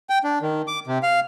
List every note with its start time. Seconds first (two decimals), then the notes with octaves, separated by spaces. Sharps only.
0.10 G5
0.24 D4
0.42 D#3
0.68 D6
0.87 C3
1.03 F5